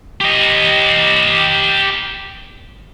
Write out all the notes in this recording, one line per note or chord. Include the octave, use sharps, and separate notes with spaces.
G4 D#5